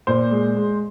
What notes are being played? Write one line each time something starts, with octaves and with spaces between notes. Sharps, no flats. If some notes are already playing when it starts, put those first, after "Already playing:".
A#2 C5
G#3
G#3